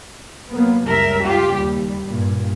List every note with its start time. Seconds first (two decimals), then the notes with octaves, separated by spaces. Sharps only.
0.51 F#3 A#3 B3
0.86 C#2 F#2 G3 A#4 E5
1.23 F4 G4
1.53 D#2 G3
2.06 G2 A#2